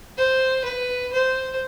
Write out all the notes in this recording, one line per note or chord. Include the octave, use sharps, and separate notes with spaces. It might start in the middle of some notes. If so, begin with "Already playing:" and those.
C5
B4
C5